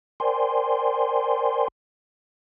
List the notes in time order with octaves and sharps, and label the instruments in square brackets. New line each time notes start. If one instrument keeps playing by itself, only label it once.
[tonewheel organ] A#4 C5 D5 G5 G#5 C6